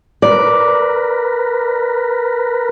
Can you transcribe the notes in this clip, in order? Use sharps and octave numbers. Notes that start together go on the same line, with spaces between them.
A#4 B4 D5